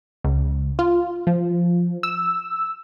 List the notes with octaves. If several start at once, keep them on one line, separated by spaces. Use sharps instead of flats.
C#2
F4
F3
E6